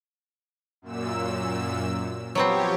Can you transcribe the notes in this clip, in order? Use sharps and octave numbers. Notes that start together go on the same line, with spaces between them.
F#2 A#2 E6
F3 F#3 B3 C4 G4 C#5